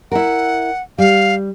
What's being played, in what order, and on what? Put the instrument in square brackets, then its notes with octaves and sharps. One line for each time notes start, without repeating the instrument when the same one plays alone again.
[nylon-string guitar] E4 A#4 [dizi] F#5
[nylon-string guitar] G3 [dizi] F5